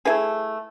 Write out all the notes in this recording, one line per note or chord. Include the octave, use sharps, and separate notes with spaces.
A3 E4 G#4 B4